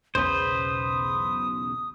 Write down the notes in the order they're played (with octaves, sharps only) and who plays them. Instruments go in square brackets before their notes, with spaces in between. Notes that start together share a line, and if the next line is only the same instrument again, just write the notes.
[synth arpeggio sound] B1 E2 C#3 [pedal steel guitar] B4 C5 [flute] D#6